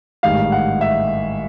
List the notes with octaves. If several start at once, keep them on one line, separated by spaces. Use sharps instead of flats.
A1 G#2 D#3 G3 F5
F#5
E5